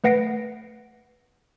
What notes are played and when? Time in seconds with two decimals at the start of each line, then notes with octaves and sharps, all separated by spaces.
0.04 A3 B4 F#5 A#6 C7 D7